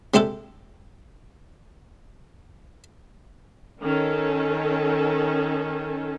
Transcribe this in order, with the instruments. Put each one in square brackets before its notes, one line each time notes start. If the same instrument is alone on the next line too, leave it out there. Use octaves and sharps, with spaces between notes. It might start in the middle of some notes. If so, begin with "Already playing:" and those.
[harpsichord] C3 G#3 D4 G4 A4
[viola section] D#3 C#4 A4